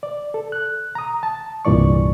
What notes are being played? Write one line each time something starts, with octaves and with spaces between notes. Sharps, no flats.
D5
A4
F#6
A#5 D#6
A5
C2 G2 A#2 E3 D5 C#6